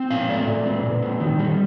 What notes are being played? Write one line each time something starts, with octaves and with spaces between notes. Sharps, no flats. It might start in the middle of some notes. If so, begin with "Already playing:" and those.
Already playing: C4
A#2 F5
A3 D5
A#2
C4
A#2
C4
D#3
G3